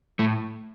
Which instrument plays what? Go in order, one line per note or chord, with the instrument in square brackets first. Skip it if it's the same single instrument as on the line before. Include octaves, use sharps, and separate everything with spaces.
[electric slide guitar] A2 A3